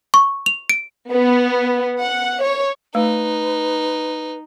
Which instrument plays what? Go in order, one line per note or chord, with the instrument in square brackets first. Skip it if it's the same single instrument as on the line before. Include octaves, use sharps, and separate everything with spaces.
[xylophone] C#6
F7
D7
[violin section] B3
F#5
C#5
[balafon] A3 [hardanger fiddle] D#4 [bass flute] B4